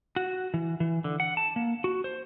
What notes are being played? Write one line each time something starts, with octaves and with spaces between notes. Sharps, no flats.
F#4
E3
E3
D3
F#5
A5
A#3
F#4
C5